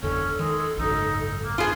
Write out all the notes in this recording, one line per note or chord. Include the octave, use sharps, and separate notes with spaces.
F#1 E2 D3 C#4 A4
D#3 G#3
G#1 C#2 F#2 D#4
A#3
B3 F4 G#4